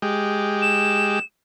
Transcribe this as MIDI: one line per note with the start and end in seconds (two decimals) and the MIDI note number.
0.02 1.19 56
0.02 1.19 67
0.62 1.25 100